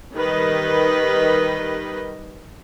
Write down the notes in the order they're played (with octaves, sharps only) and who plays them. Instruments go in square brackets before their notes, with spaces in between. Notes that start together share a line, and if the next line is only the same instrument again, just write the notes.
[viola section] D#3 G3 B4 D#5